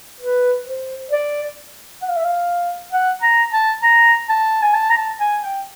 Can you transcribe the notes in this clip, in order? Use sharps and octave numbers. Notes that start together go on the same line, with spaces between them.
B4
C5
D5
F#5
F5
E5
F5
F#5
A#5
A5
A#5
A5
G#5
A5
A#5
A5
G#5
G5